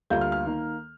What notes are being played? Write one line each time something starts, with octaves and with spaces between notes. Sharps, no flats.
D2 D3 G3 A#3 F4 G6
F6
F6
D#3 A#3